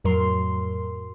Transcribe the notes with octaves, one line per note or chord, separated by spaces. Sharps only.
F2 A2 F#3 A#4 C6